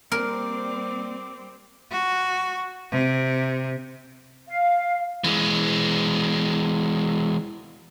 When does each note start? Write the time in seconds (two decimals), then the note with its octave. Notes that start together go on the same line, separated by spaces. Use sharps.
0.12 G3 A#3 C4 A#4 D5 D6
1.91 F#4
2.91 C3
4.47 F5
5.24 E3 G#3